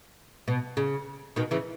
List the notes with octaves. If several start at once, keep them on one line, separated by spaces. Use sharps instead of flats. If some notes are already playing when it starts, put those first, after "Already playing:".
B2
C#3
B2 D#3
C#3 E3